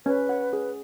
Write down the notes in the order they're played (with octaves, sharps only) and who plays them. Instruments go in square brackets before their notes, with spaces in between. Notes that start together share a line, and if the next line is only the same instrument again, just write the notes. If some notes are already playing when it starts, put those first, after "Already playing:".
[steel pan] C#4 [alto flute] B4
[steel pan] F#5
G#4